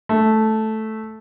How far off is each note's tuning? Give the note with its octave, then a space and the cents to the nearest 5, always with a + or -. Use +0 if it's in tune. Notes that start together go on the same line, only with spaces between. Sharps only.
A3 -5